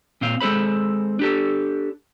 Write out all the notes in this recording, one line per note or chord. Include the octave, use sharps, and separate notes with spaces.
A#2 C4 F5
G#3 C4 A4 C5 B5
D4 G4 A4